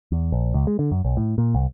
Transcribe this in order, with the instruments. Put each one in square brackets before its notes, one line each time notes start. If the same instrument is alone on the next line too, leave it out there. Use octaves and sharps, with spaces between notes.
[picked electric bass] E2
A#1
C#2
G#3
D3
F#2
B1
A2
A#2
C2